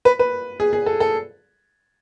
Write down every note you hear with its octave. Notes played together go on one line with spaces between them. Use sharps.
B4
B4
G#4
G#4
A4
A4